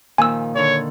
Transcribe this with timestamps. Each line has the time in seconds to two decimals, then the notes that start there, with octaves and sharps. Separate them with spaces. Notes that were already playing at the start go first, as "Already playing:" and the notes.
0.18 A#2 D#3 F3 G#5 E6
0.56 D3 D#3 C#5